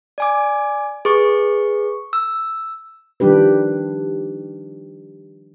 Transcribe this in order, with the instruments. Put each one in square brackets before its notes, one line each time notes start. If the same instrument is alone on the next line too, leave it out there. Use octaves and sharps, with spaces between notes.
[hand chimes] D5 G#5 D6
G#4 B4 C#6
E6
[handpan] D#3 F3 G3 D4 G4 B4